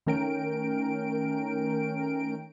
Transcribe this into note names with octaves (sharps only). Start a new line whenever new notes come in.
D#3 A3 C#4 A#4 G5 D7